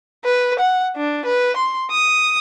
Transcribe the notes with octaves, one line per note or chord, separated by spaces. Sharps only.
B4
F#5
D4
B4
C6
D#6